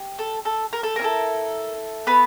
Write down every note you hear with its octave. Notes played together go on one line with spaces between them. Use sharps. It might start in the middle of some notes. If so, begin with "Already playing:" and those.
Already playing: G4
A4
A4
A#4
A4
C#4 A#4
E4 A4
B3 B4